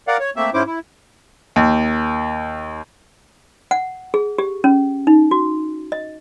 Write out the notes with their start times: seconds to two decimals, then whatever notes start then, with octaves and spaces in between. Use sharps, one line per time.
0.08 A#4 D5 F5 F#5
0.20 C#5
0.36 A3 A#3 C4 E5
0.54 G#2 C#4 E4 C5 D6
0.66 E4
1.56 D#2
3.71 F#5
4.14 G#4
4.38 G4
4.64 C#4
5.07 D#4
5.31 F#4
5.92 D#5